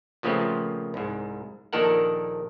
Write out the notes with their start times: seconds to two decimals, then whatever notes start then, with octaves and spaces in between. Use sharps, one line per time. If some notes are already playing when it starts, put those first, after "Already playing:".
0.23 A#2 C#3 F3 A3 B3 C4
0.94 C2 G#2
1.73 A#1 A#2 D#3 A4 A#4 F#5